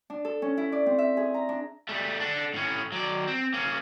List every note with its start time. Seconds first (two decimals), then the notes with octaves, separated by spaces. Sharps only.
0.10 D4
0.25 A4
0.42 C#4
0.57 E4
0.72 D5
0.86 C4
0.98 E5
1.17 G#4
1.34 A#5
1.49 D4
1.89 G3 A3
2.20 D4 A4
2.54 A2 C#4
2.92 F#3 D5
3.27 C4
3.54 A#3 C#4